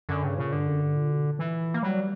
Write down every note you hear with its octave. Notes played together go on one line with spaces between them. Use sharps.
F#2 D3
G2 C#3
A#2 C#3
G2 D3
F#2
G2
A#2
B2
A#2
E3
A#3
F#3 G3